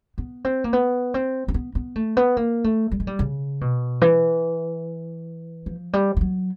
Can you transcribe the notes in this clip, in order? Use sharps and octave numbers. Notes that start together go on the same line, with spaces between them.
B3
C4
A#3
B3
C4
C4
B3
B3
A3
B3
A#3
A3
G3
G#3
G3
C#3
B2
E3
F3
G3
F3
F#3